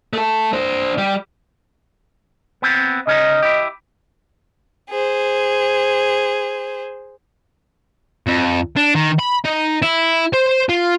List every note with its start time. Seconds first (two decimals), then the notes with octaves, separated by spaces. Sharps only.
0.13 A3 A4
0.53 D4 C5
0.98 G3 G4
2.62 B3 C4
3.07 C#3 C#4 D#4 D#5
3.42 E4 G4
4.90 G#4 C5
8.27 F2
8.77 D4
8.95 D#3
9.19 B5
9.45 D#4
9.82 E4
10.33 C5
10.69 F4